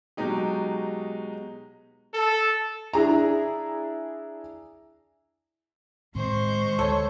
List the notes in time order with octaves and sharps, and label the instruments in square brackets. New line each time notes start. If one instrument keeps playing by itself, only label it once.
[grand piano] B2 F#3 G#3 D#4 G4
[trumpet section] A4
[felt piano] D4 E4 G#4 A#5
[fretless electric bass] A2 D#3 C4 [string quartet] G#3 C5 C#6
[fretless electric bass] D2 [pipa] A4 C#5